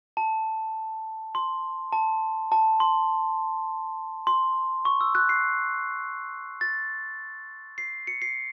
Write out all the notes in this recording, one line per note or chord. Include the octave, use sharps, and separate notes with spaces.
A5
C6
A5
A5
C6
C6
C#6
E6
F#6
C7
A6
C7
C#7
C7